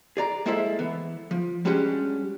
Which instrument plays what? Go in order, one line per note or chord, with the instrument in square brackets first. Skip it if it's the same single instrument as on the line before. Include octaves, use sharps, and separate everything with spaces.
[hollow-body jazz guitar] G#4 D5 A#5
G#3 A#3 E4 A4 C5 E5
E3 B3
F3
G3 G#3 C#4 D4 F#4 G4